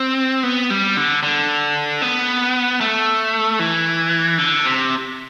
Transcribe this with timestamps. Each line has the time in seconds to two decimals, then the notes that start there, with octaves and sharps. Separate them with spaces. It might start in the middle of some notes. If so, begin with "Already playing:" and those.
Already playing: C4
0.43 B3
0.70 G3
0.97 D3
1.23 D3
2.02 B3
2.81 A3
3.59 E3
4.38 D3
4.66 C3